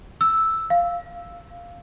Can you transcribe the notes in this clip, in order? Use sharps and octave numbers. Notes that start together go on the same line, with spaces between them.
E6
F5